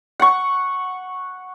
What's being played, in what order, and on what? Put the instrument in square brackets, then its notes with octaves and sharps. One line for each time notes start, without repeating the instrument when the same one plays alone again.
[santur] F#5 C#6